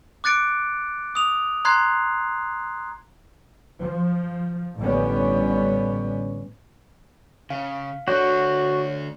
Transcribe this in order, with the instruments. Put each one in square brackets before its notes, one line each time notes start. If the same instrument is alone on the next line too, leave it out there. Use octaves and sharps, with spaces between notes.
[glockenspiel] D6 F#6 A6 C#7 D7
D#6 F7
A#5 C6 F#6 G#6 C7
[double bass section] F3
A1 A2 D3 G3 B3 C#4
[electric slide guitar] C#3 [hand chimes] F5
[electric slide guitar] D3 A3 D4 [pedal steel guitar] F#4 [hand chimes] C#5